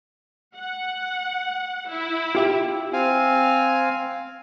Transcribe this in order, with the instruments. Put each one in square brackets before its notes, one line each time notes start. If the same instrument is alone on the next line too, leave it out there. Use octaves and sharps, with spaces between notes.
[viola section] F#5
E4
[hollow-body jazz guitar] F4 G4 E5
[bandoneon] C4 F5 G#5